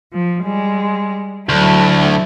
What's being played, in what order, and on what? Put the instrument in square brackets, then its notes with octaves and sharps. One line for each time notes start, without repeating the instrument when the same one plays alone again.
[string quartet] F3
G3 G#3
[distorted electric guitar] D2 [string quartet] F#3 A3 E4